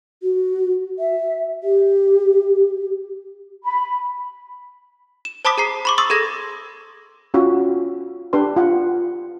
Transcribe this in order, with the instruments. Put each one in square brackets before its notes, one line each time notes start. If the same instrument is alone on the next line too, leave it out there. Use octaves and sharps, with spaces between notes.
[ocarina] F#4
E5
G4
[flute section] B5
[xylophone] E7
C5 A5 B5 D6 D#6 B6
G#4 A#5 C7
B5 C#6 D6
C6 C#6 D#6 E6 A6
G#4 A4 G#6 A#6
[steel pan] C#4 F4 F#4
D4 G4 B4 C6
F4 F#5